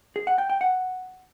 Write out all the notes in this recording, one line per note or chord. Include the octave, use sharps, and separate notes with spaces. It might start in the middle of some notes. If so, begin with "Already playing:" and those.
G#4
F#5
G5
G5
F#5